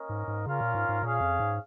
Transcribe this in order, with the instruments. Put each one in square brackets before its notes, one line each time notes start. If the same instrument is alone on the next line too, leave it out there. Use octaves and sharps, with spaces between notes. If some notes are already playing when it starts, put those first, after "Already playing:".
Already playing: [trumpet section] A#3 C#4 A#4 D#5
[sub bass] G#2
G#2
[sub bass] C#3 [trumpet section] C#4 F4 A#4 F5
[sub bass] A#2
G#2
G#2
[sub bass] A#2 [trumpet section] C#4 G#4 F5
[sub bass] F2
G#2